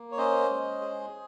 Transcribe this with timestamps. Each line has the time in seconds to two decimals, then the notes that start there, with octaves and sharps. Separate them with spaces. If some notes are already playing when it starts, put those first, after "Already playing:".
Already playing: A#3
0.12 C#5
0.18 C#4 C5 D#5
0.49 G#3
0.81 G#4